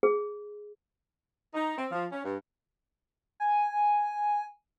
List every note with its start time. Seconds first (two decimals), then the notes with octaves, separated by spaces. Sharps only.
0.03 G#4
1.54 D#4
1.78 C4
1.92 F3
2.11 C#4
2.24 G2
3.40 G#5